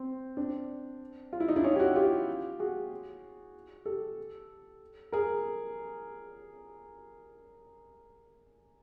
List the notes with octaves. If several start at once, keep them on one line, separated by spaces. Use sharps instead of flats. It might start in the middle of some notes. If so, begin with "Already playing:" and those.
Already playing: C4
C4 D4
F4
E4
D#4
D4 E4
C#4 D#4
G4
E4 F#4
F4 G4
F#4 G#4
G4 A4
G#4 A#4